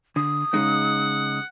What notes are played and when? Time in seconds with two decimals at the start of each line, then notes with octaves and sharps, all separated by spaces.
0.16 D3 D#6
0.54 C#3 G#3 D#4 F#5